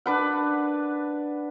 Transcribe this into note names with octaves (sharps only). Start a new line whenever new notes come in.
D4 B4 F#5